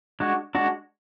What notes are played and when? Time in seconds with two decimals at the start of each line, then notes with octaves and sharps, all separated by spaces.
0.20 G#3 D4 F#4
0.55 G#3 D4 F#4